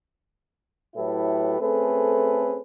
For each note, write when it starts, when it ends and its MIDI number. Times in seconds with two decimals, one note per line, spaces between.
0.96 1.59 45
0.96 1.59 54
0.96 1.59 64
0.96 1.59 67
0.96 1.59 69
0.96 1.59 71
1.60 2.61 57
1.60 2.61 60
1.60 2.61 61
1.60 2.61 68
1.60 2.61 69
1.60 2.61 71